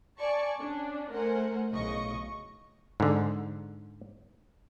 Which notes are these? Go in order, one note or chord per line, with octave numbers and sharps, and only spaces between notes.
D5 G#5 A5 C#6
C#4 D4
A3 A#4 C5 F#5 G#5
B1 A2 C#3 D#5 C#6
G#2 D3